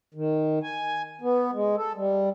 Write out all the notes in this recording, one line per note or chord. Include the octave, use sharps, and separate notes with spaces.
D#3
G#5
B3
G#3
A4
G3